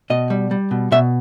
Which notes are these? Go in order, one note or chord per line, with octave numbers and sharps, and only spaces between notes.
B2 D#5
G3
G3
B2
B2 E5